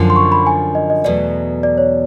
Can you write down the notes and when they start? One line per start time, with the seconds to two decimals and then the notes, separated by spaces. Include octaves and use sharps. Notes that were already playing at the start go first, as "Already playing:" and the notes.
Already playing: F#2 D3 F3
0.10 C6
0.16 C#6
0.32 B5
0.46 G#5
0.75 D#5
0.90 D#5
1.04 E2 B2 F#3 A3 D5
1.63 D5
1.78 C#5